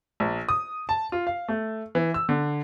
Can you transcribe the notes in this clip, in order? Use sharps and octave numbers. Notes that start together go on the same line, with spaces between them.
A#1
D#6
A5
F4
F5
A3
E3
E6
D3